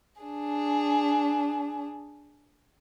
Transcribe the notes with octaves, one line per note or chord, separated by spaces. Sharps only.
D4 G#4